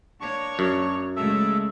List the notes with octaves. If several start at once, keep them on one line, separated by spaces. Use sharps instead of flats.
A#3 D4 C#5 C#6
F#2
C#3 G#3 A3 A4 E5